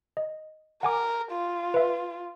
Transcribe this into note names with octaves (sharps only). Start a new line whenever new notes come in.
D#5
A#4 F#5 G#5 D6
F4
B4 E5